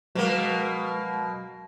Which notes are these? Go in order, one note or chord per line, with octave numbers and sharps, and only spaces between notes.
B2 F#3 G#3 A#3